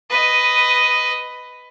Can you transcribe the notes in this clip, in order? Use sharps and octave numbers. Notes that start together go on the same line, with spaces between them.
B4 D#5